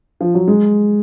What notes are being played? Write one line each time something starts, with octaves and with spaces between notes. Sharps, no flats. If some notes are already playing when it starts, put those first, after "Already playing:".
F3
F#3
G#3